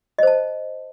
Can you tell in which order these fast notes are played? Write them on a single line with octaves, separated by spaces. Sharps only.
D#5 C5 A5